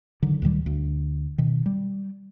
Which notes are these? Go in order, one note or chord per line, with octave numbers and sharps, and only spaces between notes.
D3 D#3 F#3
D2 A#2 D#3 G3
D2
B2 D#3
G3